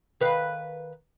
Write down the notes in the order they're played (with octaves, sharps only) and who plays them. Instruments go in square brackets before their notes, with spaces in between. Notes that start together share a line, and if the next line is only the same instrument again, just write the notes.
[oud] D#3 B4 F5